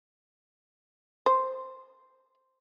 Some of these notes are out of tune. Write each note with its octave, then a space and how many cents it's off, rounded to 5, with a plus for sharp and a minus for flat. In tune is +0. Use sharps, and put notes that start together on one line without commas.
C5 +0